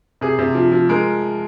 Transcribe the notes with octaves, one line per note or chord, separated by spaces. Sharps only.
C3 G#4
C3
F3
F3
G#3 A#4